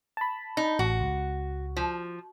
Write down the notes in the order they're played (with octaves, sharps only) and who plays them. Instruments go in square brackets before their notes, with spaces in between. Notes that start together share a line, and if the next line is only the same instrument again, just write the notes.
[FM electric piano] A5 B5
[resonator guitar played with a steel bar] D#4
[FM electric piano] A1 [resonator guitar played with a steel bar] F#4
[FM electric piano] C#2
[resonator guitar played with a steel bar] F3